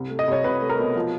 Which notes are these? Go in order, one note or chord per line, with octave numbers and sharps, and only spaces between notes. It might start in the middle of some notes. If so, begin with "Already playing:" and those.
Already playing: C2
A3
D#5
C2 C#5
C2 B4
A3
A#4
B2
F3